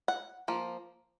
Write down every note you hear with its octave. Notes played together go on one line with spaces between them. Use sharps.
F#5
F3 A#3